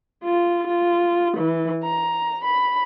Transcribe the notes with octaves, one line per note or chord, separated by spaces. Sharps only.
F4
F4
E3
A#5
B5